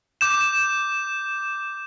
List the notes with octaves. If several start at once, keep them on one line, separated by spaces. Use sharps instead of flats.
D6 G6 E7